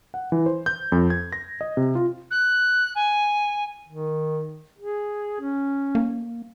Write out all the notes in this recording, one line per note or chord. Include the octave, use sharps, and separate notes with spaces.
F#5
E3
C5
G6
F2
G#6
A#6
D#5
C3
F4
F#6
G#5
D#3
G#4
C#4
A#3